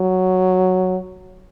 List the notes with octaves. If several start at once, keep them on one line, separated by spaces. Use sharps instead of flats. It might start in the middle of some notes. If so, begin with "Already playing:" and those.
Already playing: F#3